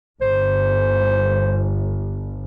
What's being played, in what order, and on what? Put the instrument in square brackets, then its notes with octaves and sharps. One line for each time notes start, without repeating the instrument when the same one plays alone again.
[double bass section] G1 [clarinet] C5